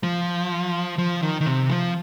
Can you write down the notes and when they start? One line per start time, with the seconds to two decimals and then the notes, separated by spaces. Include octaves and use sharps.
0.03 F3
0.98 F3
1.22 D#3
1.41 D#3
1.46 C3
1.70 F3